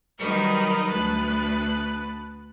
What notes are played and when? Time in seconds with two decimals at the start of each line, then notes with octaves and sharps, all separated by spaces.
0.19 D#3 F#3 G3 D#4 A#4 B4
0.90 D2 B4 A5 F#6